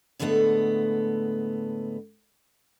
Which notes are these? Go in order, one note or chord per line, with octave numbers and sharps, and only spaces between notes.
A2 D3 G#3 A3 B3